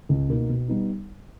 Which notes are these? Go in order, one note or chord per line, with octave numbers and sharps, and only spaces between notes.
C#2
B2 A#3 D#4
B2
G3 B3 D#4